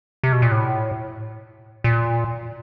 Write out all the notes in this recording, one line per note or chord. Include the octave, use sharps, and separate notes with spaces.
C3
B2
A#2
A2
A#2